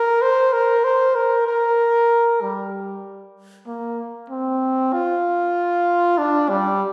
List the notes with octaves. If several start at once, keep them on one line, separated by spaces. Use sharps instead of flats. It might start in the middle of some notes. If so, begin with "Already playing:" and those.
Already playing: A#4
C5
A#4
C5
A#4
A#4
G3
A#3
C4
F4
D4
G3